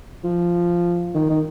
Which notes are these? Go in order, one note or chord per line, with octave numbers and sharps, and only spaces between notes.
F3
D#3
D#3